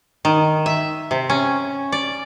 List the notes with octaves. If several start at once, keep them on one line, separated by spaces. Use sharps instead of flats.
D#3
E5
C3
C#4
D5